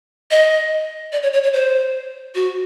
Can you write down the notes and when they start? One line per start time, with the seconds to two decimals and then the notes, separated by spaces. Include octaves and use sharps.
0.31 D#5
1.12 D5
1.23 C#5
1.33 C#5
1.43 C#5
1.53 C5
2.35 F#4